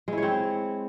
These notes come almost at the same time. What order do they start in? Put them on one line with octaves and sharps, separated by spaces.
G#3 E4 C#5 C4